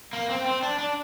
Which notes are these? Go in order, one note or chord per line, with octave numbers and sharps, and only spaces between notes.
A#3
C4
C4
D4
D4